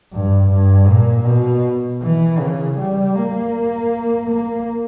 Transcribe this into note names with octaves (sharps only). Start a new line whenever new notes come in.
G2
G2
A#2
B2
E3
C#3
G3
A#3
A#3